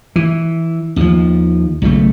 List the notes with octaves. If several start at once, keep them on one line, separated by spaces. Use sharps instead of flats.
E3
D#2 F3
B1 C#3 A3